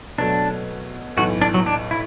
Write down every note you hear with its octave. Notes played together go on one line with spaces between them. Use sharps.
B2 F#3 A3 D4
B1 A2 E3 A3 F#4
D4
F#3
D4
E4